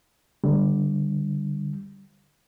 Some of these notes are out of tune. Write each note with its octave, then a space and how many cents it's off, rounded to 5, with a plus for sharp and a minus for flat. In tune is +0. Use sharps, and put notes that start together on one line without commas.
D3 +0 G3 +0